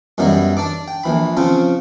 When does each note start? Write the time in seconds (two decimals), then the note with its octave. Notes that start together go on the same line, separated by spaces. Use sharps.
0.18 F#2 B2 E3 F#3 G3
0.57 D4 D5 D6
0.88 G5
1.04 A#1 E3 B5
1.37 C#3 F3 C4 F4